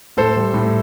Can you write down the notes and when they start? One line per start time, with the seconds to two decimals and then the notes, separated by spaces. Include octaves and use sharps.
0.17 A2 A4 C5
0.36 G3
0.54 A2